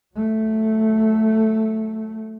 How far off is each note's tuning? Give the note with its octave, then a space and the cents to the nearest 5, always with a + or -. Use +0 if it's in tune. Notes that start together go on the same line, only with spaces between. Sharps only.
F#3 +0 A3 +0